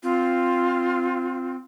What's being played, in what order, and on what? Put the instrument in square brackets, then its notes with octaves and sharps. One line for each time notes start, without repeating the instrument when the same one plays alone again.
[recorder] C4 [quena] F4